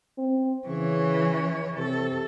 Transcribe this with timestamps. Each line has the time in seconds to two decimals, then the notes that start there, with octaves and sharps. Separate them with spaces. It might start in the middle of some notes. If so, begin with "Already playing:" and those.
0.18 C4
0.68 C#3 E3 C#5
1.77 C3 A4